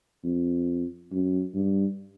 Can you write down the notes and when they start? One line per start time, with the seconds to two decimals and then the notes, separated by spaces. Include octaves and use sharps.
0.24 F2
1.12 F#2
1.55 G2